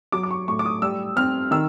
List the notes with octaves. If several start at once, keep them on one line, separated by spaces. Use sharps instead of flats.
F#3 D6
D6
C#6
A2 C#6
D6
D#6
G3 E6
C4 F6
D#3 E6